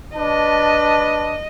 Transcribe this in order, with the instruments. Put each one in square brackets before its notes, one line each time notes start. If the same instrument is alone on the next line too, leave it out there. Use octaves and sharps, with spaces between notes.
[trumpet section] D4 B4 A5 [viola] D#5